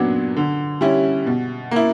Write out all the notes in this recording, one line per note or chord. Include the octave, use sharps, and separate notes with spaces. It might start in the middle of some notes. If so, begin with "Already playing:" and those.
Already playing: A#2 F#3 B3 D4
D3
G3 C#4 E4
B2
A#3 E4